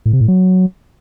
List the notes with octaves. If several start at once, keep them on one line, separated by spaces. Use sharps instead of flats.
A2
C3
A2
F#3